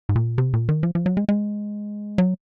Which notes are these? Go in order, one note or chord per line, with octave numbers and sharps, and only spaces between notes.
G#2
A#2
C3
A#2
D#3
F3
F3
F#3
G#3
G#3
F#3